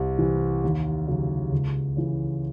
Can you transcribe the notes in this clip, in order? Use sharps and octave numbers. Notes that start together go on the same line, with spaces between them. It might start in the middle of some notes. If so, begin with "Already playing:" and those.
Already playing: C2
C3 E3
D#2
C#3 F#3
C#2
C#3 E3